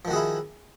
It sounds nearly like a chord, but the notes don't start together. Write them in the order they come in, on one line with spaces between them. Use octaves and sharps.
F3 D#3 F#4 G#4 E4